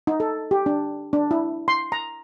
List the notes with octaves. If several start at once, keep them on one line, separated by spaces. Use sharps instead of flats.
D#4
A4
G4
D4
D4
E4
C6
A#5